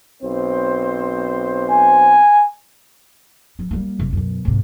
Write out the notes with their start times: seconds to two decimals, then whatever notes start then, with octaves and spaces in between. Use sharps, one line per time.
0.23 B1 C4 C5
1.70 G#5
3.59 F3 C4
3.71 G3 A#3
3.99 F#1 C3
4.13 F#2 B2
4.45 G#2 C3